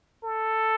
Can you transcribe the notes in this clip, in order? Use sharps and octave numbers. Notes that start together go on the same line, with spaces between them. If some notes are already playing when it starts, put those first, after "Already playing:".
A4